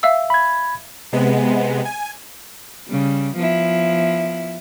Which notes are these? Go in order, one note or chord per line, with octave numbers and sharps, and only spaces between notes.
E5 F5 E6
B5 G#6
C3 G#3 B3
G#5
C#3 G3
F3 B3 E4